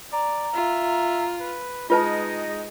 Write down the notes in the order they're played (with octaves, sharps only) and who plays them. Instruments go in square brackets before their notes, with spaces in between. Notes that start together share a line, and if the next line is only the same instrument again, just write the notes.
[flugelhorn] D5 [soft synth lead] A#5
[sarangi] F4 [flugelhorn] E5
[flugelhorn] B4
[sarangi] G#3 [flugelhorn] D#4 [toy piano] F4 B4 A5 [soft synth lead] A#6